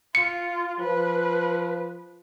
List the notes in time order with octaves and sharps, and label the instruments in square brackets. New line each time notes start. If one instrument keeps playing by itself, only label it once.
[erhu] F4 [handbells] C#7
[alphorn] F3 [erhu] B4